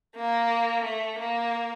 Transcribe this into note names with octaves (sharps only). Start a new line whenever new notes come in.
A#3
A3
A#3